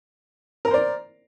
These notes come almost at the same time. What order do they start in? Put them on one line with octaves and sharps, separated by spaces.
A#4 A#5 C5 D5